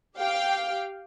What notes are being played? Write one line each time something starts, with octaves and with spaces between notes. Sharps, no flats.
G4 F5 G5